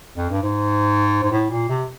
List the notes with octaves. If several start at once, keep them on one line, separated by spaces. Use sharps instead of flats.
F2
G2
G#2
G#2
A2
A#2
C3